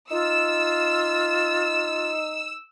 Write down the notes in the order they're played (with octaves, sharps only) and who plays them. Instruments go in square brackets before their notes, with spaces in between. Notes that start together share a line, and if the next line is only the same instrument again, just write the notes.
[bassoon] D#4 [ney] F4 [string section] E6